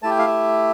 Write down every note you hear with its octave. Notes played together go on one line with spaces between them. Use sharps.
A3 E4 G4 A5
G5
F5
E5